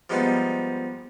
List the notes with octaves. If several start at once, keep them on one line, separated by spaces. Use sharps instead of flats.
F3 G3 G#3 B3 D#4